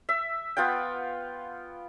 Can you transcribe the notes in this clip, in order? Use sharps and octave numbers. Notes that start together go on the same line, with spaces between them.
E5
B3 F4 F#5 G5